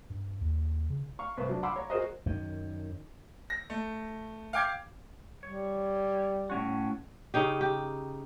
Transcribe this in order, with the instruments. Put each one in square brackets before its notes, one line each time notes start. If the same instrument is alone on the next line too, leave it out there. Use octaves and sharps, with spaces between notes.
[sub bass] G2
D#2
C#3
[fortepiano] F5 C#6
C2 B4 C5
F#3 D4
F5 F#5 B5 C6 D6 E6
C#5 A#5
F#4 G#4 A#4 C5 D#5
[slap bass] F#2 D#3
[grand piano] A#6
A3
F5 G5 D6 G#6 C7
[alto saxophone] G3 [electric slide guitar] C#5
[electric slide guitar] A2 C#4 F#4
[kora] C#3 D#4 G4
G4